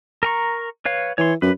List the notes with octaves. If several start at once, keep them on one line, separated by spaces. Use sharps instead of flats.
A#4 A#5 C#6
B4 C#5 F5
E3 C#5 C6
F#2 B4